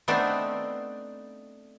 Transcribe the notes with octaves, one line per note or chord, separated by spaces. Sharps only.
A3 B3 C4 D4 D#4